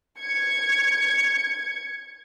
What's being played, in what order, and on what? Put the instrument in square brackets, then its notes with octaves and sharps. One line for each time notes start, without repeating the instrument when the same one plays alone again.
[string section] G#6 C#7